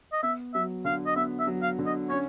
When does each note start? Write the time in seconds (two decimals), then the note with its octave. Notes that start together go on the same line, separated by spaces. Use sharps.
0.13 D#5
0.23 B3 E5
0.54 F#3 E5
0.85 D3 F5
1.06 D#5
1.16 B3 E5
1.40 E5
1.47 F#3
1.63 F5
1.79 D3
1.86 D#5
2.09 C#4 C#5